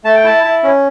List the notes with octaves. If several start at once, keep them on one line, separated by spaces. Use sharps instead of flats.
A3 A5
G5
E4 A5
E4
C#4